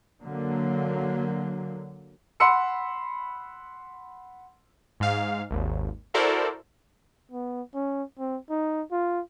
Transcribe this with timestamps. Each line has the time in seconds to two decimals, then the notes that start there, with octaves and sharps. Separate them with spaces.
0.25 D3 F#3 A#3
2.40 F#5 B5 C6 E6 C#7
5.00 G#2 F5
5.50 G#1 D#2
6.14 E4 F#4 A4 A#4 C5 D5
7.31 B3
7.75 C#4
8.19 C4
8.50 D#4
8.92 F4